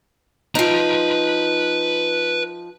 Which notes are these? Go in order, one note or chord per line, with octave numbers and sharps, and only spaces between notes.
F3 D#4 B4 A#5